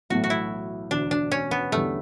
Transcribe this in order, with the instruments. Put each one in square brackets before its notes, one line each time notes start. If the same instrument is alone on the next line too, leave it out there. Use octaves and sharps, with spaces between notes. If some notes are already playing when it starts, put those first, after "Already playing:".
[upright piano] B1 A2 E3 A3 [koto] F#4
[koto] F#4
E4
[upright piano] E1 D2 D3 [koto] D4
[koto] D4
C#4
B3
[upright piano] E2 D3 G3 [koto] A3